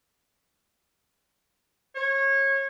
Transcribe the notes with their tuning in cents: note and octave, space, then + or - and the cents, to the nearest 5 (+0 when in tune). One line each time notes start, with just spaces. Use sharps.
C#5 -25